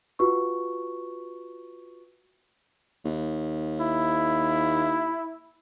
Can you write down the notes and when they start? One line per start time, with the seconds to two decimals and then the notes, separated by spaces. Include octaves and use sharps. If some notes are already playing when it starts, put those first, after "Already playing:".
0.19 F4 F#4 B4 C#6
3.05 D#2
3.80 E4